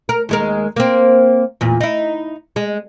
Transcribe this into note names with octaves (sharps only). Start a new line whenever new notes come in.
A#4
D#2 G#3 A#4
A#3 C4
E2 A#2
D#4 E4
G#3